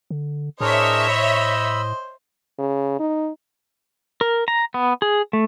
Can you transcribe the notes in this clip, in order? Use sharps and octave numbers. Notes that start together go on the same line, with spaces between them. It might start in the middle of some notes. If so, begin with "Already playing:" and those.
D3
A2 D4 G#4 A#4 C5 C#5 D#5 E5
B5 E6
C#3
D#4
A#4
A#5
B3
G#4
A3